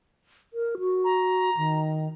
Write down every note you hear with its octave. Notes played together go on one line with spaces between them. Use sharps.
A#4
F#4
A#5
D#3